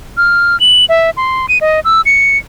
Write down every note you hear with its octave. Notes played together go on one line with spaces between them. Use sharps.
F6
F#7
E5
C6
D#7
D#5
E6
C#7